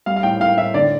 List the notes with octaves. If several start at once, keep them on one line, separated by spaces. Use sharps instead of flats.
G3 F5
F5
A2 G5
A2 F5
A2 E5
D3 D5